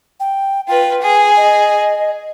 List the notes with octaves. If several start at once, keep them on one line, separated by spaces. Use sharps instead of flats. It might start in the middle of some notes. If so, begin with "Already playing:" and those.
G5
F4 B4 G5
G#4
D#5